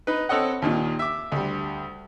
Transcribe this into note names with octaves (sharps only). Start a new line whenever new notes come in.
D#4 B4
C4 A4 C#5 D#5 F#5
D#2 A#2 D#3
E5 D6
D2 G3